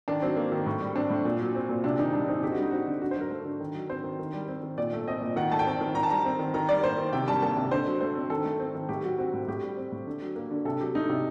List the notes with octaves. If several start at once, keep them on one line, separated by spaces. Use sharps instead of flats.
D#3 D4
F#3 C4
A#3
D#3
A2
G3
C4 D4
A2
A#2
F#3
C4
A#2
C3 D4
D#3 D#4
G3 D4
C4 D#4
D3 G4
F#4
G3 D#4
C4 F#4
D3
D3 F#4
C5
F#3 A#4
A3
D3
D#3
F#3
C4 C5
D#3
D#3
G3
C4
D#3
A#2 D5
A3
C4 D#5
A#2
D#3 F#5
A3 A5
G5
C4 A5
D#3
D#3 A#5
A5
G3 A#5
C4
D#3
D#3 A#5
G3 D5
A#3 C5
D#3
C3 G5
G3 A5
A#3 A5
C3
D3 C5
F#3
A3 C5
C4
D#3 A4
A3
C4
D#3
A2 G4
F#3 F#4
C4 F#4
A2
A2 G4
G3
C4
A2
D3
F#3
A#3
D3
C3 A4
F#3 G4
A3 D#4
C3